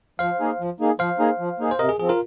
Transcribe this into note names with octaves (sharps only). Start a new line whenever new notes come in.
F3 C5 F5
A#3 D#4 G#4
F3
A#3 D#4 G#4
F3 C5 F5
A#3 D#4 G#4
F3
A#3 D#4 G#4
C5
C3 A#4 D#5
G#4
F3 C4 G#4
F4 A#4